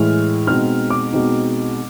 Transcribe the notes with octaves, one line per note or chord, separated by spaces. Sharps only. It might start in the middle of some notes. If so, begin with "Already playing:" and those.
Already playing: A2 E3 G#3 F6
B2 G#3 C4 D#4 F6
D6
B2 G#3 C4 D#4